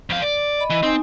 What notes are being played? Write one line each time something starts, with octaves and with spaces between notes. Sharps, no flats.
F2 F5
D5
D#5 B5
E3 D#5
C4 D#4 G#5